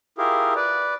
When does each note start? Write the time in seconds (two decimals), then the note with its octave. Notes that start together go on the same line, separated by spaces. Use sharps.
0.18 E4 F4 G4 G#4 A#4
0.56 B4 D5